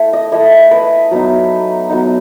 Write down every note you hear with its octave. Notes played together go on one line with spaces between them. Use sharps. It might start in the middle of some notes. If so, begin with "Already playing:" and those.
Already playing: A3 E4
D#5
A3 E4 D#5
B4
F#3 B3 D#4
F#3 B3 D#4